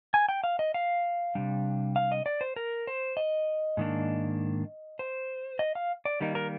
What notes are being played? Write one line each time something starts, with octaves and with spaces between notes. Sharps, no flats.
G#5
G5
F5
D#5
F5
C3 G3 D4
F5
D#5
D5
C5
A#4
C5
D#5
G#2 D#3 A#3 D4
C5
D#5
F5
D5
D#3 G3 A#3 D#4
A#4